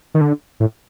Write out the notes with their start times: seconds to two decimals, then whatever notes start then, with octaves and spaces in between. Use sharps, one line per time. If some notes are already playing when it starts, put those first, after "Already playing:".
0.14 D#3
0.21 D3
0.60 A2